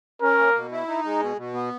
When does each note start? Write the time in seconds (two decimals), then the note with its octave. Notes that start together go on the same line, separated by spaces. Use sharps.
0.21 C#4 A#4
0.39 A#3
0.55 B2
0.72 E4
0.88 D#4
1.04 G#3
1.20 B2
1.37 B2
1.54 B3